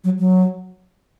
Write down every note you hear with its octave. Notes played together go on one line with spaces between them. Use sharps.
F#3
F#3